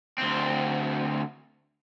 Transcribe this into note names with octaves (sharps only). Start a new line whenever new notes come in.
D2 C4